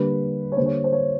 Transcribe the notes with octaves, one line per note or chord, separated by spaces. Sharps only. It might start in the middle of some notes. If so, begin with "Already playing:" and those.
Already playing: D3 G3 A#3 B4
C#5
D3 G3 A#3 C5
C#5
C5
C#5